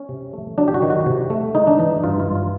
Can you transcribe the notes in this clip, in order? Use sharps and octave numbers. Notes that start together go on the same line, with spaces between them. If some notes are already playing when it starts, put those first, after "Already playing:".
Already playing: C#4
C3
A3
F#3 D4
G4
F#4
D#3
F#4
C3
A3
G#3 D#4
D4
E3 D#4
G2 F4
F4
G2
F4